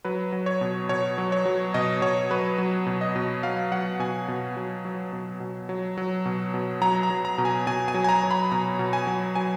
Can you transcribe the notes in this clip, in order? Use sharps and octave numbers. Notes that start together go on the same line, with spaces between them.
F#3 B4
F#3
C#5
B2
B2 C#5
F#3
C#5
F#3
B2 D#5
B2 C#5
F#3 B4
F#3
B2
D#5
B2
F#3 F5
F#3 F#5
B2 G#5
B2
F#3
F#3
B2
B2
F#3
F#3
B2
B2
F#3 A#5
A#5
F#3
A#5
B2
G#5
B2 G#5
G#5
F#3
G#5
A#5
F#3
B5
B2 A#5
B2
G#5
F#3
F#3 G#5